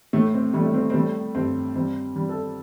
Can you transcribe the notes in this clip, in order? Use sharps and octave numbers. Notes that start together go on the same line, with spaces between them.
A2 A3
C4
G3 A3
A3
C4
C4
G3 A3
G2 C4
G3 C4
G3
A4